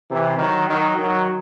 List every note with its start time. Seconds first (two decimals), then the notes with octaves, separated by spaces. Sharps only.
0.10 C3 E3
0.39 D#3 F#3
0.68 D#3 F#3
0.97 D#3 F#3